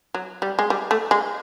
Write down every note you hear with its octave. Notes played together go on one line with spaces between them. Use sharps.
F#3
G3
G#3
G3
A3
G#3